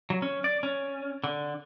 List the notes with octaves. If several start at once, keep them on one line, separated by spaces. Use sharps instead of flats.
F#3
C#4
D5
C#4
D3